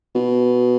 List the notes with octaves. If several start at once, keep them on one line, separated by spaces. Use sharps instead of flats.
B2